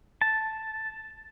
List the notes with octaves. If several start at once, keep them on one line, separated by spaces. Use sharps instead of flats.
A5